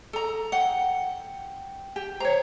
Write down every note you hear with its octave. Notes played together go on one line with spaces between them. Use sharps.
A4 A#5
F#5 G5
G4
C5 C#5 A#5